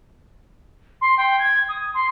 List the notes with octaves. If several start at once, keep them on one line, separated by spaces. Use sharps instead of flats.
C6
G5
G#6
D#6
C6